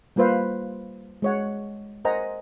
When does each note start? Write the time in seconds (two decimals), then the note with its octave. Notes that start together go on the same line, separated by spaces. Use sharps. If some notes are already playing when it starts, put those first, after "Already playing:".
0.16 G3 A#3 F4 B4 C5 F5
1.22 G#3 C#5 F#5
2.05 A#4 C5 D#5 F#5 G#5 A#5